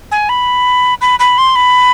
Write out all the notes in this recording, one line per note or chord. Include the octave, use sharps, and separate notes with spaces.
G#5
B5
B5
B5
C6
B5